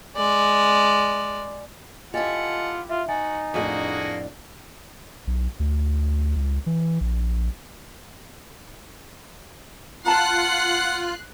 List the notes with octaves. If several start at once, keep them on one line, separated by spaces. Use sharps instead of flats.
G#3 D5
E4 F4 G4 A4 D#5 F#5 G#5 A6
F4 E5
D#4 F#4 G#5 A6
F2 A2 A#3 D4 F#4 G#4
B1
D2
C#2
E3
A#1
F4 F#5 A5 A#5 F#6 C7